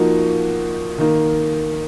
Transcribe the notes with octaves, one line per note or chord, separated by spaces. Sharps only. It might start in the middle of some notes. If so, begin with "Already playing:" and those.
Already playing: F3 A#3 D#4 F#4
D#3 A#3 D#4